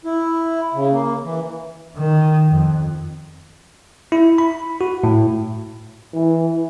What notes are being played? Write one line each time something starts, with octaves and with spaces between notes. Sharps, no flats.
E4
C#3
A#3
E3
D#3
F2
E4
B5
F#4
A2
E3